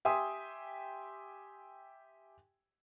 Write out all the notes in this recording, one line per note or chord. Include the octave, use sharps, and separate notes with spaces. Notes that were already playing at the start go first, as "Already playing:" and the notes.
G4 E5 G5 G#5 C6 D#6